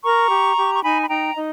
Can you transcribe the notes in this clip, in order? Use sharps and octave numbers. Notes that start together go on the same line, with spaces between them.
A#4 A#5 C#6
G4
G4
C#6
D#4 G#5 B5
B5
D#4 G5 A#5
D#4 D#5